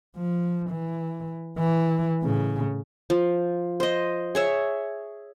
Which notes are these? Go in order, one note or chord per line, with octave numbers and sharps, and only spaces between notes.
F3
E3
E3
A2 C#3
F3
C5 D#5
G#4 C#5 E5